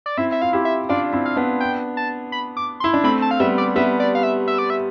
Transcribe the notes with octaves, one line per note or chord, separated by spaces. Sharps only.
D5
C4 E4 E5
E5
F4 F5
E4 G4
E5
D4 F4 D5
C4 E4
F5
B3 D4
G5
A5
B5
D6
C6
E4
D4
A3 C4 B5
A5
F5
G3 B3 E5
D5
G3 B3 E5
D5
F5
E5
E5
D5
E5